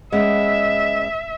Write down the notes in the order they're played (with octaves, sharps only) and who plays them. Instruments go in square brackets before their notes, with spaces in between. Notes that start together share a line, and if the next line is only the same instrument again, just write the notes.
[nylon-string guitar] G#3 B3 C#4 [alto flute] D#5 [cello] E5